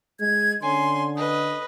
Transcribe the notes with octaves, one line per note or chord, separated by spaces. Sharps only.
G#3 G#6
D3 C#4 G#5 C6
B4 D#5 D#6